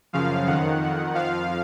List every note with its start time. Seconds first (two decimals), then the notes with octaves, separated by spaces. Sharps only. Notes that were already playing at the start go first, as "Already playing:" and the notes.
0.13 F#2 C#3 F3 F5
0.47 F2 D#3 F#5
0.81 F2 D#3
1.14 F2 F3 F5